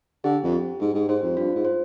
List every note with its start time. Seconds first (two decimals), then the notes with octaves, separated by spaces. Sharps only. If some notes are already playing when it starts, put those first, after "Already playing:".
0.24 D3 G4
0.43 F2
0.52 G4
0.80 G#2 G4
0.94 G#2
1.08 G#2 C5
1.23 F2
1.37 G2 F4
1.55 G#2
1.65 C5